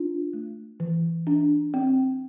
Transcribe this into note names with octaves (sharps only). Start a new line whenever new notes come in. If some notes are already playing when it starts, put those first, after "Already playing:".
Already playing: D4 F4
A3
E3
D4
C4